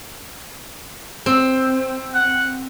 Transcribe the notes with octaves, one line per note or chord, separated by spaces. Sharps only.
C4
F#5